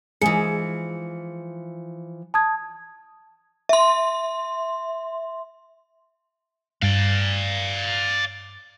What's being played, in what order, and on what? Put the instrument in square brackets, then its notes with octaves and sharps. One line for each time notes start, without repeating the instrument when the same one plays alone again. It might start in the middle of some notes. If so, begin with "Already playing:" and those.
[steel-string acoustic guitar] E3 F3 [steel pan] G#3 G#4 [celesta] C#7
[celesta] A5 D#6 G#6
[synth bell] E5 C6
[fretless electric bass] G2 [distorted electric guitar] D5 F5